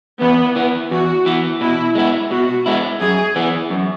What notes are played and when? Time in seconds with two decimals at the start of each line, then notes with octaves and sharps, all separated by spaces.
0.21 E2 B3
0.56 E3 B3
0.91 E2 F#4
1.26 E3 B3
1.61 B2 E4
1.95 G#3 B3 E4
2.31 B2 F#4
2.66 G#3 B3 E4
3.01 F#2 G#4
3.36 E3 B3
3.70 F#2